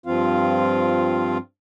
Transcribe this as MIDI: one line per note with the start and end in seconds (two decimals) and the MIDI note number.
0.06 1.37 43
0.06 1.37 53
0.06 1.37 60
0.06 1.37 65
0.06 1.37 77